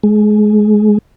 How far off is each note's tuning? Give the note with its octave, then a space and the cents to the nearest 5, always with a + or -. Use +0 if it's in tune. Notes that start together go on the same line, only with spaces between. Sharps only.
G#3 +25